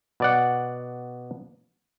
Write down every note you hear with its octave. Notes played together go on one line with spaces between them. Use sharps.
B2 D5 F#5